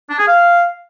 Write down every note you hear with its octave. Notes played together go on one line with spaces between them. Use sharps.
D4
G#4
F5